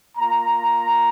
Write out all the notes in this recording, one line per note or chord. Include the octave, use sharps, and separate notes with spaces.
A#3 F4 A#5